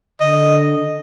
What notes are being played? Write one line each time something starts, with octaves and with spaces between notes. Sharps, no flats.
D3 D#5